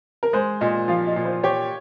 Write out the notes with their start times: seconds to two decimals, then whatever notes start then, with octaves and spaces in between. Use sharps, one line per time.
0.23 A#4
0.33 G#3 C5
0.61 A#2 D#5
0.88 F3 F5
1.07 D#5
1.16 A#2
1.25 C5
1.43 G4 C#5